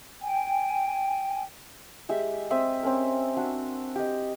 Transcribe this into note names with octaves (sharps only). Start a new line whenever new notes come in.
G5 G#5
G#3 G4 E5
C4 E5 D#6
C4 C#4 A#4
D4 F#4
G4 D#5